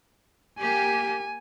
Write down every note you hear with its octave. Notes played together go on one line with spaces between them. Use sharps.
A#3 G4 G#5